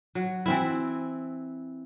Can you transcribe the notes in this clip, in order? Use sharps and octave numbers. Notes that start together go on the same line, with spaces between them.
F#3
E3 C4 E4